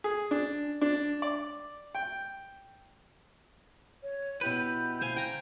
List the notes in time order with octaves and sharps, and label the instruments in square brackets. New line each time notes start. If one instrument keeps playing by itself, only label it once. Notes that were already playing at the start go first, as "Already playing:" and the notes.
[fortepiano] G#4
D4
D4
D5
G5
[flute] C#5
[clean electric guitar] B2 G4 B4 [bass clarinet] E4 [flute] G6
[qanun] C5 F5 G#5
G5 A#5